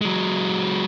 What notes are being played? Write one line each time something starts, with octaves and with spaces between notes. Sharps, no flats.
F#3 G#3